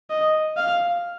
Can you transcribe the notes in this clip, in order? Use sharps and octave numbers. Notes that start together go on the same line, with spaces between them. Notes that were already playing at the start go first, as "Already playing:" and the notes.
D#5
F5